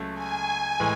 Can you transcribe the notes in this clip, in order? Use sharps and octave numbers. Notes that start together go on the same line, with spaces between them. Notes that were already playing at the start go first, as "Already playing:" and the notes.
Already playing: C#2 C#3 F#3 A3
G#5
A2 E3 G#3